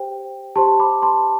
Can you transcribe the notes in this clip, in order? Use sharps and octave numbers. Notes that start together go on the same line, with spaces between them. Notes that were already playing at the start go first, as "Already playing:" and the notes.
Already playing: G4 C5 G5
G4 C5 A5 C6
B5 D6
A5 C6